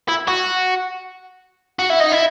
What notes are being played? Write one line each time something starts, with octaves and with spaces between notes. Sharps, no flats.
E4
F#4
F#4
E4
D#4
E4